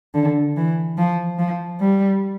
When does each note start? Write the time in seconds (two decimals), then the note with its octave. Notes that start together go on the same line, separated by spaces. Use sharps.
0.14 D3
0.56 E3
0.98 F3
1.39 F3
1.80 G3